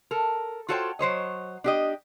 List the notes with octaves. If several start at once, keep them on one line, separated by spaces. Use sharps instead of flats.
A4 A#4
F4 F#4 A4 C5 C#5 G5
F#3 C5 C#5 D#5
D4 G4 D#5